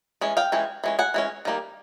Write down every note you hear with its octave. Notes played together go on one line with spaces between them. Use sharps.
E3 G#3 C#4
F5 G5
E3 G#3 C#4
E3 G#3 C#4
F#5 G#5
E3 G#3 C#4
D#3 G3 A#3